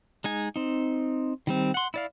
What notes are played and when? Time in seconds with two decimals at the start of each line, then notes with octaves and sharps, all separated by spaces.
0.24 G#3 D#4 G#5
0.56 C4 D#4
1.47 D#3 G3 C4
1.74 F#5 C6
1.94 E4 D5 F5